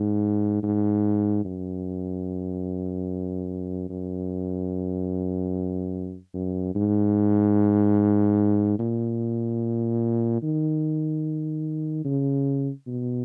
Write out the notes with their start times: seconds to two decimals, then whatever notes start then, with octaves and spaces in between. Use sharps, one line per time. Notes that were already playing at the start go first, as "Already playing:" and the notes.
Already playing: G#2
0.63 G#2
1.45 F#2
3.90 F#2
6.34 F#2
6.75 G#2
8.79 A#2
10.43 D#3
12.05 C#3
12.87 B2